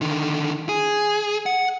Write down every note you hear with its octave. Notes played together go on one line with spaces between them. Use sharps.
D3 D#3
G#4
F#5